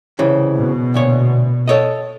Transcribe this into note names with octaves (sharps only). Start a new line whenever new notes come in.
C2 C#3 E3
B2
D2 A#2 C#5
A4 C#5 D#5